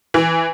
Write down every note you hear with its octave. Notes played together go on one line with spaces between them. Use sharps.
E3